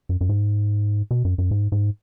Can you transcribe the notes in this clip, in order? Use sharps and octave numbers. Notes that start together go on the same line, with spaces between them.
F#2
F#2
G#2
B2
F#2
F#2
G#2
G#2